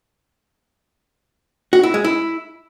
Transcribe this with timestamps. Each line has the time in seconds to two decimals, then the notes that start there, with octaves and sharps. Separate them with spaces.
1.73 F#4
1.83 E4
1.94 G#3
2.05 E4